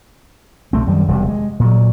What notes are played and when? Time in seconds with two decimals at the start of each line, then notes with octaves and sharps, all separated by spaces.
0.73 B1 A3 C4
0.87 F#2 D#3 G3
1.08 E1 C3 G3
1.29 G#3
1.60 A#2 F#3